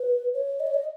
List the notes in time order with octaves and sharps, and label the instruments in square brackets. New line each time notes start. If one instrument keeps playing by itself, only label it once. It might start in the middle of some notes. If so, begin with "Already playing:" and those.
Already playing: [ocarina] B4
C#5
D#5
C#5
D#5